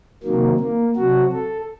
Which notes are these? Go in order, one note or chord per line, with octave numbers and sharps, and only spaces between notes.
C3 D#3 F#3 A#3
A#3
C3 F#3 F#4
A4